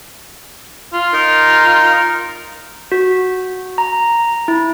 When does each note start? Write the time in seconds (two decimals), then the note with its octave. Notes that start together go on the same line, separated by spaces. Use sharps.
0.94 F4
1.13 D#4 A#4
2.92 F#4
3.78 A#5
4.48 E4